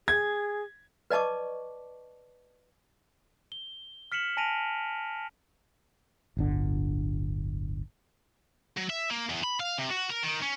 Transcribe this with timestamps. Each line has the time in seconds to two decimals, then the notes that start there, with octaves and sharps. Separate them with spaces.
0.08 G#4 G#6
1.10 B4 D5 D#5 A5 C#6 D6
3.52 G7
4.12 F6 B6 C#7 E7 F#7
4.37 G#5 A5 A#6 D7 D#7 F7
6.37 D1 G1 D3
8.77 F#3
8.90 E5
9.10 A#3
9.30 E2
9.44 B5
9.60 F5
9.78 C3
9.90 F#4
10.10 A#4
10.23 D#3
10.42 C#4